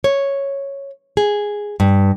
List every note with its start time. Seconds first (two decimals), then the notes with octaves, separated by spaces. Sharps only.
0.04 C#5
1.17 G#4
1.80 G2